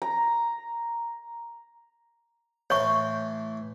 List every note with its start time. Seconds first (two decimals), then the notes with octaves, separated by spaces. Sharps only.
0.02 A#5
2.70 A2 E3 C#5 C6 C#6